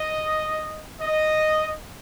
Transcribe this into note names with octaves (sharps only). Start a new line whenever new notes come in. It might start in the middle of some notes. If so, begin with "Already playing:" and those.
Already playing: D#5
D#5